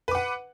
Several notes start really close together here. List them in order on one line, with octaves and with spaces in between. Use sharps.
B4 D6 F#5